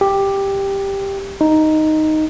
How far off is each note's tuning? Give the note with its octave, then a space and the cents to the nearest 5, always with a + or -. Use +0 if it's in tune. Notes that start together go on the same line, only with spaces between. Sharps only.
G4 +5
D#4 +0